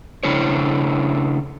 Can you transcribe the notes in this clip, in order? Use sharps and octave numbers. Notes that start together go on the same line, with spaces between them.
C#3 A3 D4 E4 C5 C#5